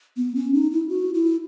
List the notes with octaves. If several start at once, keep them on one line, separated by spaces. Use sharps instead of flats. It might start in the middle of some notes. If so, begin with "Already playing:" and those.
B3
C#4
D#4
E4
F#4
E4